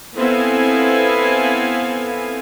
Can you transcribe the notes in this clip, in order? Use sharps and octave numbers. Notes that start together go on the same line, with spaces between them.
B3 C4 E4 A4 F5 G#5